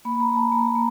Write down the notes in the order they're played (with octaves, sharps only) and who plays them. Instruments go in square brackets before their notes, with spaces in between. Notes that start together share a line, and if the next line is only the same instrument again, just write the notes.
[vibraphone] A#3 B5
A#5
A#3
A5
A#3 A#5
A#3